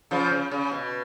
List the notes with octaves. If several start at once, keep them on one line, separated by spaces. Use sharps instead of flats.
C#3 F3
C#3
C#3
B2